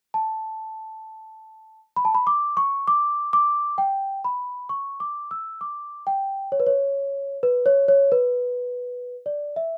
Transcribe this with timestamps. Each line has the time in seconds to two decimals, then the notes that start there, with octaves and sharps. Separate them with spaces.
0.14 A5
1.96 B5
2.05 A5
2.15 B5
2.27 D6
2.57 C#6
2.88 D6
3.33 D6
3.78 G5
4.24 B5
4.69 C#6
5.00 D6
5.31 E6
5.61 D6
6.07 G5
6.52 C#5
6.60 B4
6.67 C#5
7.43 B4
7.66 C#5
7.88 C#5
8.12 B4
9.26 D5
9.56 E5